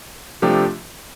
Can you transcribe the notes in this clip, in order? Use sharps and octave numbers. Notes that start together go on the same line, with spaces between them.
C3 F3 A3 D4 G4